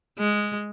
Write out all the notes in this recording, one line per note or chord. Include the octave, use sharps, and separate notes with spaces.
G#3